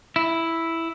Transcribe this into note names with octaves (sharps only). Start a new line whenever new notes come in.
E4